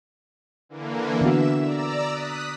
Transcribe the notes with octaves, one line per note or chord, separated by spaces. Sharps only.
D3 E3 A#3
D3 B3 F#4 E5 E7
D5 A#5 E6
D#6 F#6 B6